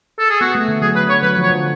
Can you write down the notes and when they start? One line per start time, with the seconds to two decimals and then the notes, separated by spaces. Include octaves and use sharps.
0.19 A4
0.30 G#4
0.41 B3 F#4
0.55 A3
0.68 D3
0.82 F#3 G#4
0.96 B4
1.09 C#5
1.23 F#3 B4
1.37 F3
1.43 C#5
1.50 D3